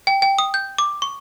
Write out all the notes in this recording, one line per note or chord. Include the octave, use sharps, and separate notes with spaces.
G5
G5
D#6
G6
D6
C#6